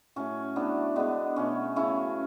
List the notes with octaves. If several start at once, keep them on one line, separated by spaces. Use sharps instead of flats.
A2 F#3 A3 C#4
A2 F#3 A3 B3 D4
D3 G#3 B3 D4
B2 F#3 A3 C#4
C#3 F#3 A3 C#4 E4